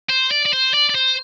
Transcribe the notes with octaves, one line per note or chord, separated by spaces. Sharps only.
C5
D5
D5
C5
D5
D5
C5